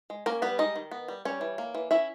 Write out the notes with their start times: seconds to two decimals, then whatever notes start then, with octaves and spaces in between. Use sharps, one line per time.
0.10 G#3
0.26 A#3 C#4 A#4
0.42 G3 B3 B4
0.58 G#3 D#4 D#5
0.76 D#3
0.91 B3
1.08 G3
1.25 G3 C#4 C#5
1.41 E3
1.58 A#3
1.75 E3
1.91 C#4 E4 E5